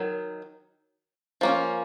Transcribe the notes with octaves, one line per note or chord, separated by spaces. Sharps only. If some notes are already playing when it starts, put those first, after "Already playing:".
Already playing: D#3 F#3
F3 A#3 C#4